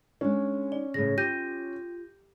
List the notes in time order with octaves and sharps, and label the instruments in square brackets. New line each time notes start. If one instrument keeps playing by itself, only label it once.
[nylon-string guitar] G#3 D4 [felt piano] C#4
[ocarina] D#4 [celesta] D5
[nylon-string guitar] A2 C#3 [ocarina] G#4 [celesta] A#6
[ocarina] F4 [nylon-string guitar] G4 [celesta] G6 A#6 D#7